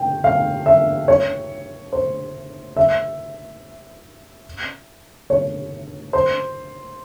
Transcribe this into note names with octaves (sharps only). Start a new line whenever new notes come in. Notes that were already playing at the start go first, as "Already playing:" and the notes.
Already playing: G5
F5
E5
C#5
C5
E5
C#5
C5